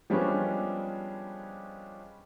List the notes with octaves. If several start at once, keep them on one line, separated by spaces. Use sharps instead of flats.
F3 G3 G#3 B3 C#4 D4